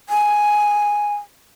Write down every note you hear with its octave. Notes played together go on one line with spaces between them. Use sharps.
G#5